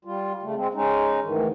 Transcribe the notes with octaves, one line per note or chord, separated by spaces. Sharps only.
G3 F4
C#3 A3
G#3 C4
G#3 C#4 D#4
D2 G#2 D#3 E3